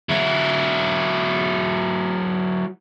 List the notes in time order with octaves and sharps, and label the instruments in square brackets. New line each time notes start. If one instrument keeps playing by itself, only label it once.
[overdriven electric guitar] F#3 E4